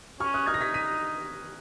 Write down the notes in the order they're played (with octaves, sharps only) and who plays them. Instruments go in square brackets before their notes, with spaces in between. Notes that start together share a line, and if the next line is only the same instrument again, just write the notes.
[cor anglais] C#4 [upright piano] C#6 F6
[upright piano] D#6 F#6
[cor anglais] D#4 [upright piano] F6 G#6
[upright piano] A#6
G#6 B6
B6 D#7